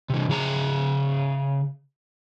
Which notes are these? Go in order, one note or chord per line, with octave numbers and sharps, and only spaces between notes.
C3 E3
C#3 G#4 A#5